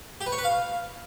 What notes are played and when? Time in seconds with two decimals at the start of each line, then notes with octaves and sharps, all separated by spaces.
0.21 G4
0.26 B4
0.32 C#5
0.38 B4
0.44 F5